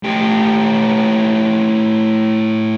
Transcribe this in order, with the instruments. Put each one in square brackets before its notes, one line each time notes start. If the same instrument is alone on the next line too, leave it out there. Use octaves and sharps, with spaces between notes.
[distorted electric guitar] A2 G4